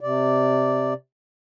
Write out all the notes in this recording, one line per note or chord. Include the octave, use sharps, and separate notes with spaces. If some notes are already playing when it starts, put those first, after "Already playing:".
C3 D5